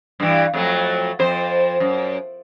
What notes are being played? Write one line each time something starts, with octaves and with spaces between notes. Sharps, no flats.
G2 E3
F2 F#3 A3
F2 C5
F#2